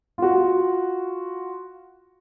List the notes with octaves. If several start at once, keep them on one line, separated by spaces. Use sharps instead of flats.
F4 F#4